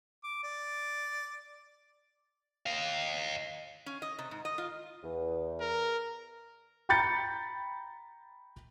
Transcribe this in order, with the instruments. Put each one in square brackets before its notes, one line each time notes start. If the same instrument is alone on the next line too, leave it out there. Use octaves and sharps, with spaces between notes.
[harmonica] D6
D5
[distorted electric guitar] D#5 F5
[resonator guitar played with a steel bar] C#4
D#5
C3
G#2
D#5
F4
[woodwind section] E2
[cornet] A#4
[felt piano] G5 A#5 B5 G6 A6 C#7